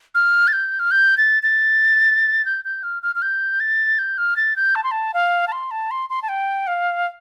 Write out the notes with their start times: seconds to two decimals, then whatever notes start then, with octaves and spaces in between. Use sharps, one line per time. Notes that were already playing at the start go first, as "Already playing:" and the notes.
0.15 F6
0.48 A6
0.53 G6
0.79 F6
0.91 G6
1.17 A6
1.43 A6
2.45 G6
2.65 G6
2.83 F6
3.03 F6
3.15 F6
3.22 G6
3.60 A6
3.99 G6
4.18 F6
4.37 A6
4.56 G6
4.75 A5
4.84 C6
4.91 A5
5.14 F5
5.48 A5
5.52 C6
5.71 A5
5.91 C6
6.10 C6
6.23 A5
6.29 G5
6.67 F5